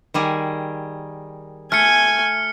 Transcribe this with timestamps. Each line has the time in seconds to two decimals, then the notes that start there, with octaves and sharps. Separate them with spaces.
0.14 D#3 G3 G#4
1.72 A3 G#5 F6 C#7